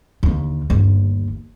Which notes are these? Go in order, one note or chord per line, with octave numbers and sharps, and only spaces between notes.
D#2 D3
G1 D#2